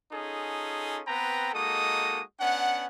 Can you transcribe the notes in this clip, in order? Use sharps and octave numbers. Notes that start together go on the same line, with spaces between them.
C#4 D#4 F4 G#4 A4
B3 C4 B4 G5 A#5
G#3 A#3 D#4 F#4 A4 D#6
B3 C#4 D4 F#5